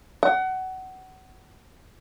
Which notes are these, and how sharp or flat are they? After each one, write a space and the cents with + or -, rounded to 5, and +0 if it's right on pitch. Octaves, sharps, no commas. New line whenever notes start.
F#5 +25